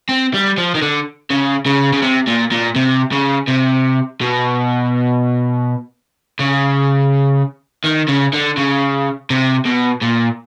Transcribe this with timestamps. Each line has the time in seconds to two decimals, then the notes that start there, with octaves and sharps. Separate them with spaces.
0.09 C4
0.34 G3
0.58 F3
0.75 D#3
0.82 D3
1.30 C#3
1.66 C#3
1.93 C#3
2.03 C3
2.28 A#2
2.52 A#2
2.76 C3
3.12 C#3
3.48 C3
4.21 B2
6.39 C#3
7.85 D#3
8.09 C#3
8.33 D3
8.57 C#3
9.30 C3
9.66 B2
10.02 A#2